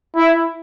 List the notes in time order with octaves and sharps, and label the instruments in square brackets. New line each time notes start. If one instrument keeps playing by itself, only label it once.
[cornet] E4